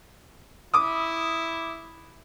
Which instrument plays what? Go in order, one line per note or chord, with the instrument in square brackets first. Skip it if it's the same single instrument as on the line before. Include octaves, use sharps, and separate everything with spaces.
[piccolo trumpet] E4 [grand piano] D6 D#6